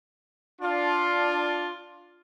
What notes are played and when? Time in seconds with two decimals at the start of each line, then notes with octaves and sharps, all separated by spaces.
0.61 D4 F4